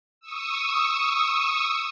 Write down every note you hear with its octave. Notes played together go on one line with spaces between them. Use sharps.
C#6 D#6 E6